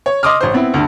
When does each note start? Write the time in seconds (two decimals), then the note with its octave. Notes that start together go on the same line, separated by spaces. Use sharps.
0.06 C#5
0.23 D#5 C6 D6 D#6 F6
0.41 A1 C5
0.54 B3 C4 E4
0.74 D2 G2